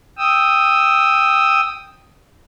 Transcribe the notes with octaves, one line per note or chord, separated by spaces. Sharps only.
G5 D#6 E6